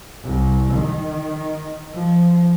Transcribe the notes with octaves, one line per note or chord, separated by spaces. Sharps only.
C2
D#3
F3